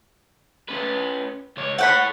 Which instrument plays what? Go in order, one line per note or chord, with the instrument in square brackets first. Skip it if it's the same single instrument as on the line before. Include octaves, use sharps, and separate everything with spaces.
[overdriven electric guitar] C#4 B4
C#2 C#5
[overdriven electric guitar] A4 C#5 [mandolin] F#5 G5 B5